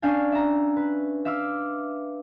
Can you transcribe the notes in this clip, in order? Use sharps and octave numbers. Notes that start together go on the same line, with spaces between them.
C#4 D4 D5 F5 G5 G#5
E5 A#5
B4
E5 F5 D6 E6 F6